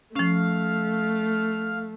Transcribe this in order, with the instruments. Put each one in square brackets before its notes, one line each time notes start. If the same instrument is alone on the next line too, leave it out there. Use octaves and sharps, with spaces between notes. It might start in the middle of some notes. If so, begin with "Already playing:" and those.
[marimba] F3 C#4 [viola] A3 [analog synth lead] F5